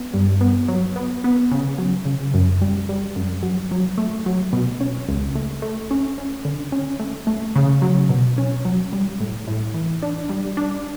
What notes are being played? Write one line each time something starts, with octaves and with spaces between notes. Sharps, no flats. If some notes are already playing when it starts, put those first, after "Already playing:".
Already playing: B3
G2
B3
F#3
B3
B3
C#3
F#3
C#3
F#2
G3
G3
F#2
F#3
F#3
A3
F#3
B2
C#4
C#2
A3
A3
C#4
C#4
D3
C#4
A3
A3
C#3
F#3
B2
C#4
F#3
G3
A2
A2
E3
D4
G3
D4